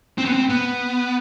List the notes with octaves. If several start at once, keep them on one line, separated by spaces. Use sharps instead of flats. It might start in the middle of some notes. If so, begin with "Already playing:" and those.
C4
B3
C4
B3